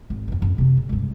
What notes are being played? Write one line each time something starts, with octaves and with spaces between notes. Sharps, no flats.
G#1
F2 E3
F#2
C3 B3
D3
C#2 G2